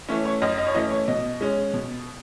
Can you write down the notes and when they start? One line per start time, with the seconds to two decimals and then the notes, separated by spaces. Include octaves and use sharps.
0.09 E3 A3 C#4 C#5
0.25 C#5
0.42 F#2 D#5
0.58 D#5
0.67 C#5
0.75 E3 A3 C#4 D#5
0.91 C#5
1.08 B2 D#5
1.41 G#3 C#4
1.73 B2